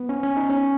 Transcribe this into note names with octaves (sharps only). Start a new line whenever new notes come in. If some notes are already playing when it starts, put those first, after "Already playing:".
Already playing: B3
C#4
C#4
D#4
C#4